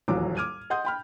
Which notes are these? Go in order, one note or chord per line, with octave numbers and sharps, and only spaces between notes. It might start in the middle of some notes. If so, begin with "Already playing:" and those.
D#1 A#1 E2 F#3 D6
D6 F6 G#6 D#7
D#5 F#5 C6 D#6 G6
G5 B5 F6